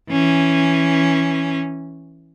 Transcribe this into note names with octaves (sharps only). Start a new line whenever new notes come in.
E3 C#4